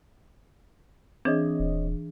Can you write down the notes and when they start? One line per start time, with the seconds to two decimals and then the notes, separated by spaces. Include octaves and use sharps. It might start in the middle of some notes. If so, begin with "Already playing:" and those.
1.25 E3 C4 D4 G#4 C#5 D#5
1.60 D#1